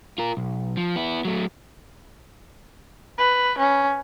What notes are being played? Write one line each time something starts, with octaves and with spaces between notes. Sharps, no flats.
F4 A#4
B1
F3
B3 E4
F#3 A3
B4
C#4